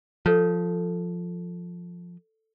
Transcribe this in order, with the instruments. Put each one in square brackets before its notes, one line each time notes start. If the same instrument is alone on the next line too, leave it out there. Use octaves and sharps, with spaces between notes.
[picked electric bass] F3 [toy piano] A4 C#5